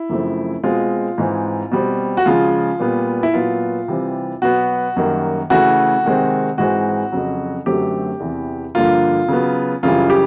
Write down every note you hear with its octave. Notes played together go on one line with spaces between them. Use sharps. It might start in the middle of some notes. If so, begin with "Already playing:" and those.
Already playing: E4
F#2 C#3 F3 A3 C4
B2 G#3 C4 F4
G#2 E3 G#3 C4
B2 G3 C4
F#4
C#3 F3 G#3 F4
A#2 G3 B3
E4
A#2 F#3 B3 F4
C3 E3 G3 C4
B2 F#3 B3 F#4
F#2 D#3 G3 A#3
C#3 E3 A3 F#4
C3 D#3 G#3 C4
G#2 E3 G#3 C4 F#4
F2 C#3 F#3
F#2 D3 F#3 A3 C4 G4
E2 C3 E3
G2 D3 F3 A#3 F4
C#3 F#3 B3
F#2 C#3 E3 G3 F4
G4